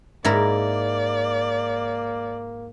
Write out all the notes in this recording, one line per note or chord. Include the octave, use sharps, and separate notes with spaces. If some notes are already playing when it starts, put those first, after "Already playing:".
G#2 A#3 E4 A#4 D5